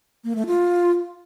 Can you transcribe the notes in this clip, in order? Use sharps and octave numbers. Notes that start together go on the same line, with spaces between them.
A#3
A3
F4